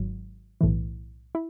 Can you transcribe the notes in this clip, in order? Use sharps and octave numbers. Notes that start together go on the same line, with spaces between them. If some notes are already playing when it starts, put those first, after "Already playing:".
Already playing: G#1 G#2 F#3
B1 A2 E3
E4